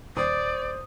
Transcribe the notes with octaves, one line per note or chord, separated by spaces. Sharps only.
D#1 C5 D5 D#6